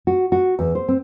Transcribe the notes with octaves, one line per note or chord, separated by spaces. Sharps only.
F#4
F#4
E2
C5
C4